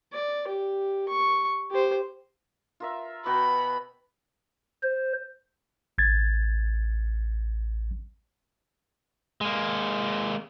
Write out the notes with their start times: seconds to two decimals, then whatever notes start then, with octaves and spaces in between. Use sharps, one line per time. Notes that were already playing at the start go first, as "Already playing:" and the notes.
0.12 D5
0.47 G4
1.08 C#6
1.71 G4 C5
2.80 F4 A#4 E5
3.26 B2 F#4 G5 B5
4.83 C5
5.98 A1 G#6 A6
9.41 G#3 A#3